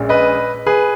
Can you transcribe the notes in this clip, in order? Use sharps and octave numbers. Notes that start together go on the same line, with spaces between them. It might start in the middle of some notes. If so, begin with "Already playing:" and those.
Already playing: A#1 A#2 G#3 C#4
B4 D#5
G#4 B4